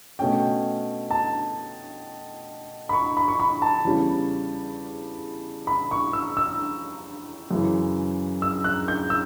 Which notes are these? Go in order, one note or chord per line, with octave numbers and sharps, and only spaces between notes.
B2 A3 C#4 G5
A5
B5
C#6
B5
C#6
B5
A5
E2 C#3 G3 C#4
B5
C#6
E6
E6
F#2 C#3 E3
E6
F#6
G6
E6